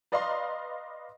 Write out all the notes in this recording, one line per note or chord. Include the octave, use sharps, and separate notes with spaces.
B4 D5 D#5 F5 A#5 C6